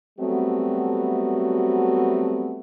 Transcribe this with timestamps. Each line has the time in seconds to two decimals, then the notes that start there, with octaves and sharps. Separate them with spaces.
0.19 F#3 G3 A3 B3 C4 F#4